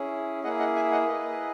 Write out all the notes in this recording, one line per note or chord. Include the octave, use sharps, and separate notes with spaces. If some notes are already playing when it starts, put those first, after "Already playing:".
Already playing: C#4 E4 G#4
A#3 E4 G#4 D#5 F#5
D#5 F#5
E5 G#5
D#5 F#5
A#3 E4 G#4 B4 D#5